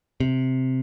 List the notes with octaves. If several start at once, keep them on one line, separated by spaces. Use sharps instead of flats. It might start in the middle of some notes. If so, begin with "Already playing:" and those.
C3